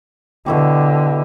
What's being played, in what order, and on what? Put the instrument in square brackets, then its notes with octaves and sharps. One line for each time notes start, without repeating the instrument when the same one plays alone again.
[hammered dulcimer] B2 E4 G4 [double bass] D3